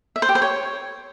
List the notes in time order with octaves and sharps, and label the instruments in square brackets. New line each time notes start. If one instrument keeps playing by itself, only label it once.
[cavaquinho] E5
C5
G4
C5
C#5